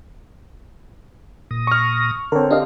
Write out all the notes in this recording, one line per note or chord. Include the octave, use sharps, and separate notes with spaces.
A#2 D#6 A#6
C#6 F6
D3 C4 A#4 C#5
D4 G4 A#4 D#5 F5